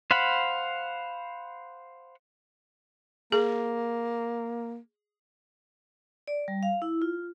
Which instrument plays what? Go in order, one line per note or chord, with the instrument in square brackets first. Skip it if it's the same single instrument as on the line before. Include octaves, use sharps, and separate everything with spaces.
[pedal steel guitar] C5 F5 F#5 B5
[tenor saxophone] A#3 [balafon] G#4
[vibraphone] D5
G3
F5
E4
F4